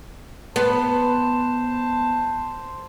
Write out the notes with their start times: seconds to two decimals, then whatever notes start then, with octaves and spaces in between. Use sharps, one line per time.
0.56 B3 C5 A5